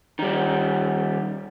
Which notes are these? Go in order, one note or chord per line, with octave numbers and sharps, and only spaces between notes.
D#3 G3